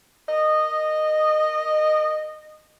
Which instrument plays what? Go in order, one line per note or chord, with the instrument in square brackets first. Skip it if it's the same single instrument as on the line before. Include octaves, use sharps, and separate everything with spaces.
[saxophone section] A#4 D#5